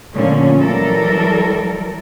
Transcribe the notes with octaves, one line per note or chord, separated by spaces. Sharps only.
A#2 D3 F3 A3 C#4
E3 F#3 G3 A4 A#4